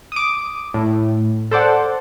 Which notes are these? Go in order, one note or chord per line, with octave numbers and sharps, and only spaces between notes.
D6 D#6
A2
A4 C5 D5 F#5